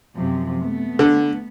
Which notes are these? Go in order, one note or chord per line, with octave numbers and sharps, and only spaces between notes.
F#2 C3 F3
A3 B3
D3